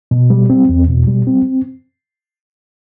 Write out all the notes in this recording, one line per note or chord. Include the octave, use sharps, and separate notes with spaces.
B2
G3
C4
E2
B2
G3
C4